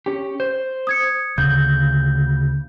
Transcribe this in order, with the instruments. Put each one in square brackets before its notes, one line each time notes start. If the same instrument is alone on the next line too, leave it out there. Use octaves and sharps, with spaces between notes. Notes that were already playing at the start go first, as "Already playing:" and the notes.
[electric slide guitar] C#4 G4
C5
[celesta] D#6 G#6 C#7
[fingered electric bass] D2 [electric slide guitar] C#3 [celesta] G6